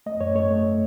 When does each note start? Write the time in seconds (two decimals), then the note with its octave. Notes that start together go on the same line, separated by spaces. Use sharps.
0.06 A3 D#5
0.21 F#2 C#5
0.35 A3 C#5
0.51 A3